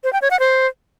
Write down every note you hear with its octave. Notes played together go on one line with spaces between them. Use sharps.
C5
G5
C#5
F#5
C5